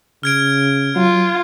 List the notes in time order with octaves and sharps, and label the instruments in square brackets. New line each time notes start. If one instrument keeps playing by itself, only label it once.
[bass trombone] C#3 [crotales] F6 G#6 D7
[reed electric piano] F#3 [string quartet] F4